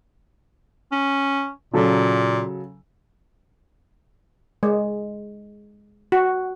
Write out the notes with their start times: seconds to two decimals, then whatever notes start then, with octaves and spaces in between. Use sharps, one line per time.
0.92 C#4
1.74 A#2 C#3 F#3 A4
4.63 G#3
6.12 F#4